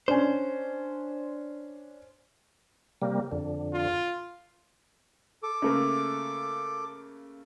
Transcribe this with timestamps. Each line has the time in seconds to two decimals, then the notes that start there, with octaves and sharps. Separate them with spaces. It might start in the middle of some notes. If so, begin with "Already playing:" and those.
0.08 C#4 D4 C5
3.02 C3 G3 A#3
3.31 F2 D3
3.73 F4
5.43 A4 D6
5.62 C#3 A3 A#3